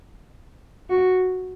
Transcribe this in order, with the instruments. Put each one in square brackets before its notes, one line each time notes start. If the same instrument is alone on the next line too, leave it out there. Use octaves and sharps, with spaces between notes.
[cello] F#4